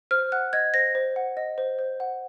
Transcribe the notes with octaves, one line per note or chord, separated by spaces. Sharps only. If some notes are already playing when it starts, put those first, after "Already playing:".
C5 F6
F#5 F#6
D#5 G#6
C5 A#6
C5
F#5
D#5
C5
C5
F#5